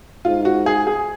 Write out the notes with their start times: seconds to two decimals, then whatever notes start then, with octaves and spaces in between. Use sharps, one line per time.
0.25 G#2 F4
0.45 F#4
0.66 G#4
0.87 G#4